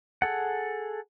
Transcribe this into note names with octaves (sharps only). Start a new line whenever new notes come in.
G#4 A4 F#5